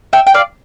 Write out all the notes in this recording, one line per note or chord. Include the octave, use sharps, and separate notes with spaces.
E5 G5
G5
D5 F5